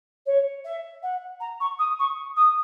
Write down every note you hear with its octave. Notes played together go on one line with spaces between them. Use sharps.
C#5
E5
F#5
A#5
C#6
D#6
C#6
D#6